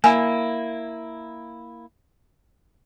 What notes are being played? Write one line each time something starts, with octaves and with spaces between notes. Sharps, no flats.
A#3 E4 G#5